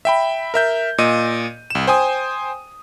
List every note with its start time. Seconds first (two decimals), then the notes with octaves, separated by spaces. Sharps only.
0.05 E5 G5 B5
0.54 A#4 E5 G6
0.98 A#2 D#5 D#7
1.70 C2 E7
1.87 C5 G5 G#5 D#6